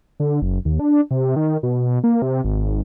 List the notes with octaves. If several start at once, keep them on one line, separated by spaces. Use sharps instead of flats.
D3
F#1
D#2
D4
C3
D#3
B2
A#3
C3
G#1